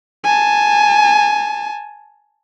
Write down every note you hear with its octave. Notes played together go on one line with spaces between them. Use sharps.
G#5 A5